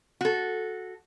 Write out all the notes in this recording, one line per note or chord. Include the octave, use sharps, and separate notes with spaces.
F#4 A4